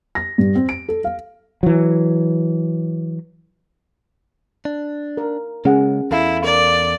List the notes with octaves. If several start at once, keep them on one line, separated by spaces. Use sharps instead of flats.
A#6
G2
C4
D7
A4
F5
E3 F#3
D4
A#4
C#3 G#3 C#4 G#4 F#5
E2 E4 A4 F5
A#4 D5